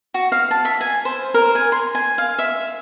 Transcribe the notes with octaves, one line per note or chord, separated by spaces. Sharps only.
F#4
F5
A5
E5
G#5
C5
A#4
G#5
C6
G#5
F5
E5